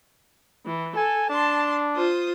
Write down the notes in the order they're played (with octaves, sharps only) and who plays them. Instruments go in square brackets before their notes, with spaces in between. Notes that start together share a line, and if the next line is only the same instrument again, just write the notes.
[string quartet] E3
[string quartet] A4 [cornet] G#5
[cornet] D4 [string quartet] A5 C6
[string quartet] F4 C5 D#6